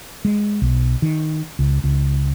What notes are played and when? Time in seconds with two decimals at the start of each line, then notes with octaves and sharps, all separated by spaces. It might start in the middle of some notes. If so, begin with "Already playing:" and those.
0.25 G#3
0.62 B1
1.02 D#3
1.59 C#2
1.84 C#2